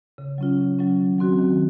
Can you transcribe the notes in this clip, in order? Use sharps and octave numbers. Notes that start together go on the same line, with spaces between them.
C#3
F#3 C#4 F4
C#3
F#3 C#4 F4
D#3
F#3 C4 F#4
D#3